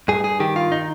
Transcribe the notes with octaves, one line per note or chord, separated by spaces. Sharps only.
G2 G#4
G#4
D#3 G4
F4
D#4